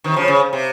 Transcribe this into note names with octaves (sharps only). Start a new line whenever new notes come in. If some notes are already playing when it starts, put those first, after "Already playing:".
C3 D#3
C#3 F3
C#3
C3